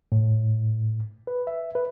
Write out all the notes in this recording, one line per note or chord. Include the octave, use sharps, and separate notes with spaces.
A2
B4
E5
B4